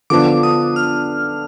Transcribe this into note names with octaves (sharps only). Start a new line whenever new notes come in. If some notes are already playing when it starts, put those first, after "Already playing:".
D3 F3 B3 D4 D6
D#6
F6